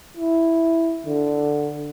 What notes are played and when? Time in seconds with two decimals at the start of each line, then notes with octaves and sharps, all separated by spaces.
0.17 E4
1.06 D3